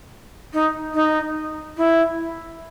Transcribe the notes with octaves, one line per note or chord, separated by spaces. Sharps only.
D#4
D#4
E4